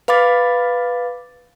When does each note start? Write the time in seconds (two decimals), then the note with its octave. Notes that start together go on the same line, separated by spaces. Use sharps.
0.08 B4 F5 B5 D6 A6